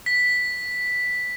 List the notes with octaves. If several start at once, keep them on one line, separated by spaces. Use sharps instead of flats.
B6